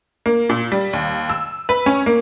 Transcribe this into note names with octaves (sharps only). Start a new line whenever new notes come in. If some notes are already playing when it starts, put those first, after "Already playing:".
A#3
A#2
G3
D#2
E6
B4
C#4
A#3